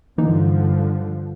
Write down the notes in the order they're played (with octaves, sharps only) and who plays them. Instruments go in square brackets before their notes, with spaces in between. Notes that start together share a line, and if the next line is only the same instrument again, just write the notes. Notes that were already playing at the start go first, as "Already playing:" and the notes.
[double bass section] G2 D3 F3 [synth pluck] E3 A#3 D#4